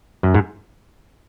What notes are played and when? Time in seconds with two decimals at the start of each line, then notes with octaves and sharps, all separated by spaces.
0.23 F#2
0.34 G#2